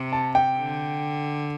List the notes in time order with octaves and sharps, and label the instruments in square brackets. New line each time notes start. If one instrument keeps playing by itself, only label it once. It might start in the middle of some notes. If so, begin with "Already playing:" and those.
Already playing: [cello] C3
[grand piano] A5
G5
[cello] D3